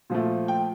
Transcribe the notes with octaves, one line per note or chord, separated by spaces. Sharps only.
A#2 F3 A3
G5